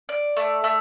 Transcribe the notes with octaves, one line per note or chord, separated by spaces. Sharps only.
D5
A3
A3